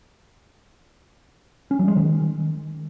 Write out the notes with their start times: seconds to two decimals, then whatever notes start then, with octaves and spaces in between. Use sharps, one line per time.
1.71 C#4
1.79 F#3
1.88 G#3
1.96 D#3